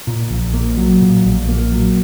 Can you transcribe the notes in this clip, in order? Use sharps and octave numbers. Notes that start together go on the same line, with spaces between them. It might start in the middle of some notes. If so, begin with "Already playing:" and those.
A#2
A#1
A#3
F#3
A#2
A#1
A#3
F#3